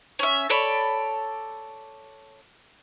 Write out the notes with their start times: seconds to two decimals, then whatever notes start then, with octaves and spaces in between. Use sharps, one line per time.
0.19 C#4 E5
0.50 A4 C#5 D5 B5